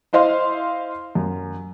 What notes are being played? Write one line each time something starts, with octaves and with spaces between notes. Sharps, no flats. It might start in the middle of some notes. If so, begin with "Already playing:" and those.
E4 C5 D#5 F5 C6
F#2